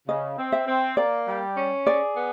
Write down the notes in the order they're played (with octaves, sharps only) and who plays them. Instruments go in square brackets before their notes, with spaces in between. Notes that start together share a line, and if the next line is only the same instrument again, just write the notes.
[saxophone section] C#3 [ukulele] D#5
[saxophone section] C4
[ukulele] E5
[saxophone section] C4
[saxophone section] A#3 [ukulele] D5
[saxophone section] G3
C#4
[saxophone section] G#4 [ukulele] D5
[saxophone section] B3